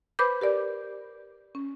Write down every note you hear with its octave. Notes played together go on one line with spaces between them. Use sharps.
B4 C5 B5 D6 G6
G4 A#4 D5
C#4